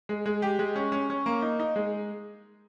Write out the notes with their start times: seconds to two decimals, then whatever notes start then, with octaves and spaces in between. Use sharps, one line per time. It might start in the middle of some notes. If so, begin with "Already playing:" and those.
0.09 G#3
0.26 G#3
0.42 G4
0.59 G#3
0.76 C#4
0.92 C#4
1.10 C#4
1.26 A#3
1.42 D#4
1.59 D#4
1.76 G#3